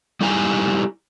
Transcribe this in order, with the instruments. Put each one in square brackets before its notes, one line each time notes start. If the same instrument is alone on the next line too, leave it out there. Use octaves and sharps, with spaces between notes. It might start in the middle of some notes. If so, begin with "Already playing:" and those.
[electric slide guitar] G3 D#4 E4 G4 G#5 A#5